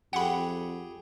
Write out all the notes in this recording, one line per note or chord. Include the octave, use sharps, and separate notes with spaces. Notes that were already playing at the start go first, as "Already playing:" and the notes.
F2 G4 G#4 F#5 G5 B5